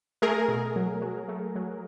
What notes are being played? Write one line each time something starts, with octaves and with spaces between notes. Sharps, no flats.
A3 G#4 A#4
B2
F#3
F#3
A3
F#3